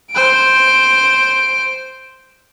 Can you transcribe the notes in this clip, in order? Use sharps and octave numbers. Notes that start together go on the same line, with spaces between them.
C5 D7